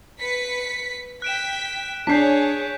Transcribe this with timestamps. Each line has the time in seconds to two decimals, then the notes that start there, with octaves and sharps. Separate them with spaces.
0.19 B4 B6 C#7
1.22 G5 F#6 B6 D7 E7
2.07 D4 G#4 C#5 G6 B6 C7